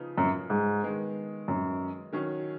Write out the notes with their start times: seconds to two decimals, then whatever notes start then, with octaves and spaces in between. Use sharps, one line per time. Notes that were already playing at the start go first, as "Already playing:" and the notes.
Already playing: C#3 F3 B3 D#4
0.18 F#2
0.50 G#2
0.83 D#3 G#3 B3
1.48 F#2
2.12 D#3 F#3 C#4